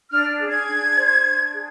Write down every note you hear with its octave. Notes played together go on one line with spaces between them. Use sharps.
D4 F6
G#4
G#6
D4
C5
D4
G#4